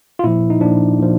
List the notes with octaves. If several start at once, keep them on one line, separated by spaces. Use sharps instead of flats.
F4
A#2 F3 E4
D#4
A#2 F3 D4
A#2 F3